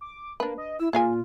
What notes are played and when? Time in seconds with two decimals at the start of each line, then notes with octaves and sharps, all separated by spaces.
0.01 D6
0.40 A#3 D4 B4
0.58 D#5
0.80 E4 E6
0.93 A#2 F4 G#4 F5 G#5